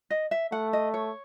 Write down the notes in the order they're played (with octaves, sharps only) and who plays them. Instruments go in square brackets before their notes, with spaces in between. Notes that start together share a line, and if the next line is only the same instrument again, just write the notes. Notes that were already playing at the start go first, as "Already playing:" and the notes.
[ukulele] D#5
E5
[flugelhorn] A3 [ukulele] F#5
[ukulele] D#5
C#5